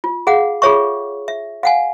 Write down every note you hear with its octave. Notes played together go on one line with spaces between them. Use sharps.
F4
G#4 F5 F#5
F4 G#4 A4 C#5 E5 C#6
E5
F5 F#5 G#5